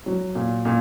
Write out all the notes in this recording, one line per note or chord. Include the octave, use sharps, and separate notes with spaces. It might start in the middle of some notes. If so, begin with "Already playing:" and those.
F#3
A#2
A#2